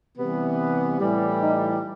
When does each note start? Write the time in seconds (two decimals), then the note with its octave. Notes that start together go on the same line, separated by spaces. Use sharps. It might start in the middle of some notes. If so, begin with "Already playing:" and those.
0.17 C3 E3 G3 B3
0.98 A2 E3 G3
1.39 D#4